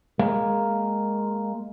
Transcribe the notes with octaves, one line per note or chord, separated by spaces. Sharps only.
G#3 A#3